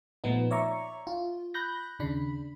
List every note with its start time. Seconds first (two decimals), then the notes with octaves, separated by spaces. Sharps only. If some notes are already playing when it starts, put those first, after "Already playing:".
0.24 A#2 F3 A3 B3 D#4
0.51 C#5 D5 E5 A#5 C#6
1.07 F4
1.54 B5 F#6 G6 A#6
1.99 D#2 C#3 D4 B5